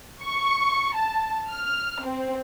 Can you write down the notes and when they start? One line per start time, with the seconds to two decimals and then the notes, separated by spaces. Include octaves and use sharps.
0.22 C#6
0.95 A5
1.51 F6
2.03 C4